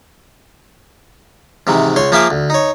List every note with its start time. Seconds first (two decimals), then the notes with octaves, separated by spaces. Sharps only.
1.67 G#2 C3 D#3 E3
1.96 C#2 C#5 C6
2.12 F3 A#3 G#4 E5 F5 D6
2.30 D2
2.50 D#4 C#5